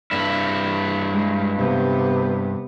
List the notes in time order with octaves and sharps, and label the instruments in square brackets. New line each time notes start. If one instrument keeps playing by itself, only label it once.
[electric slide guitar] G2 E4
[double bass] G#3
C3 B3